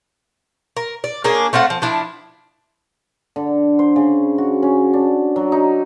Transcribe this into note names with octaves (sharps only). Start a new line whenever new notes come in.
A#4
D5
A#3 C#4 D4 G#4
A3 C4 F4 F#5
F3
F3 D4 E4
D3
C5
C#3
F#4
C#4
D4
F#3
D#4